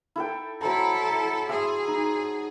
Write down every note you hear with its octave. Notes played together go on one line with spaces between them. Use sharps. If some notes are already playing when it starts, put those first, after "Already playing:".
E4 A4 G5
F#3 E4 A4 C5 A#5
G#4 E5 A5 C6
D#4